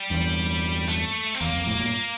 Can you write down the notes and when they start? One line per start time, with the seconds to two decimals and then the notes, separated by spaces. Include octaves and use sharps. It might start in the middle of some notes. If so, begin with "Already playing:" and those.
Already playing: G3
0.10 E2 G2
0.89 A3
1.34 C4
1.40 E2 A#3
1.53 F2
1.66 F2 A2
1.79 G2 A#2